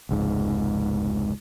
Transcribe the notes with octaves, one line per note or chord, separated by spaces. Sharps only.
F1 C#2 G#2